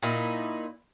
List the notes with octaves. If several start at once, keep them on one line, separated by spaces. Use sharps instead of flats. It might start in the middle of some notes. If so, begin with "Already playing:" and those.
A#2 D#4 E4